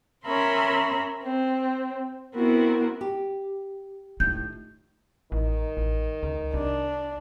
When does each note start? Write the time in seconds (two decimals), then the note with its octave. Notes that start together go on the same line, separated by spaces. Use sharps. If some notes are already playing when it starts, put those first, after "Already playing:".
0.24 C#4 A#4 E5 B5 C6
1.22 C4
2.34 B3 C4 E4 F#4 A#4
3.01 G4
4.20 A2 D#4 F4 G6
5.32 A1 D#3
5.77 A1
6.23 C#2
6.54 C2 D4